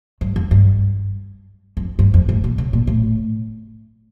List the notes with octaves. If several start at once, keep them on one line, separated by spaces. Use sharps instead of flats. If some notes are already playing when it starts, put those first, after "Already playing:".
G2
F2
G2
F2
G2
F2
A2
A#2
C#3
A#2
A2